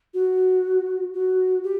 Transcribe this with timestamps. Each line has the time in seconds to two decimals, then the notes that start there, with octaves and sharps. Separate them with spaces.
0.14 F#4
1.14 F#4
1.64 G4